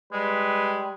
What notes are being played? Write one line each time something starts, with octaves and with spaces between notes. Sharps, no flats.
G3 G#3 B4